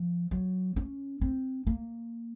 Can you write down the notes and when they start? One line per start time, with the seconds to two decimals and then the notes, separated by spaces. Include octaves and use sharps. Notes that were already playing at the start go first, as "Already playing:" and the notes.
Already playing: F3
0.31 F#3
0.76 C#4
1.21 C4
1.67 A#3